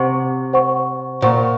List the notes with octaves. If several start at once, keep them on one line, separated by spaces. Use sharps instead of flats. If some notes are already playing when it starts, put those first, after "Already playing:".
Already playing: C3 C5 F#5 C#6
C5 F#5 C#6
A#2 C5 F#5 C#6